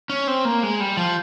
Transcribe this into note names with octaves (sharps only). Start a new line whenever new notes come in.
C#4
C4
A#3
G#3
G3
F3